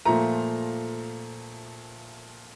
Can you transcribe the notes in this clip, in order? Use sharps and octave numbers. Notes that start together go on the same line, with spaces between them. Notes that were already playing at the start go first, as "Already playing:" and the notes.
A#2 F3 A3 A#5